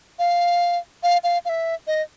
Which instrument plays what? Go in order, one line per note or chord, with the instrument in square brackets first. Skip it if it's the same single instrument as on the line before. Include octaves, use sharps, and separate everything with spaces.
[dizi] F5
F5
F5
F5
E5
D#5